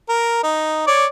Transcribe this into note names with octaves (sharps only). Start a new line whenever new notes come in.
A#4
D#4
C#5 D5